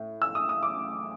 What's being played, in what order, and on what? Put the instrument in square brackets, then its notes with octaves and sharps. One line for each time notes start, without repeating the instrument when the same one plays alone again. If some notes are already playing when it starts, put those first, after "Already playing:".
Already playing: [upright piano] A2
E6
D#6
D#6
D6